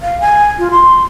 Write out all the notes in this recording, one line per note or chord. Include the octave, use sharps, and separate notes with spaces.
F5
G#5
F4
C6